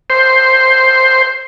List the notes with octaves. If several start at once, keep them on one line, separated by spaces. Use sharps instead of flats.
C5